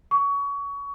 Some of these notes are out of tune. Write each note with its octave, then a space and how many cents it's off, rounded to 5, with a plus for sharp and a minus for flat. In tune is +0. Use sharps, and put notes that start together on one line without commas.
C#6 +25